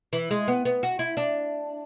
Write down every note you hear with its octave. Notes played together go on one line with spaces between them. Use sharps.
E3
G#3
B3
B3
F#4
E4
D4